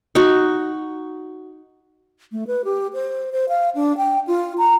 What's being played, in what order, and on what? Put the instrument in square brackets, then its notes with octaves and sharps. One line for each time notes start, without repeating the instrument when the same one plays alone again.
[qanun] D#4 F#4
[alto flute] A3
B4
G4
C5
C5
F5
D4
G5
F4
A#5